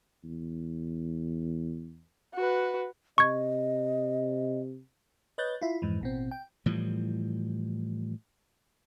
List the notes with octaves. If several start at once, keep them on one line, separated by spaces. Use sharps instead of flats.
E2
F#4 B4
C3 D#5 C#6 G#6
B4 C#5 D#5 F#6 G6 A6
E4 F4
F2 G#2 E3
A1 B2 C4
G5
A2 E3 F3 G3